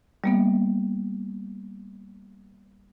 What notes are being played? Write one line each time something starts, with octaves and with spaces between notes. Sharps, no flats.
G3 A#3 B3